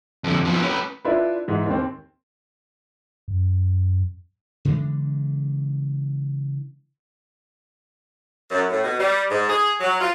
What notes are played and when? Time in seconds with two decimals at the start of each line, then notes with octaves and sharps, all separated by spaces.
0.24 F2 D3
0.45 F3 B3
0.62 C#4 B4
1.05 D4 E4 F4 B4
1.48 G#2 E3
1.66 D#2 C4
3.28 F#2
4.65 C#3 E3 G#3 D4
8.51 F#2
8.70 A2
8.84 B2
8.99 G3
9.30 G#2
9.49 G#4
9.80 F#3
10.00 F4